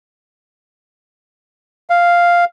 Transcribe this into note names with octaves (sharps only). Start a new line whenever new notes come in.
F5